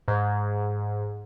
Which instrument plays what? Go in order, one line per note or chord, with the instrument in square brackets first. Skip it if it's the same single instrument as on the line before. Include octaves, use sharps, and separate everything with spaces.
[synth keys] G#2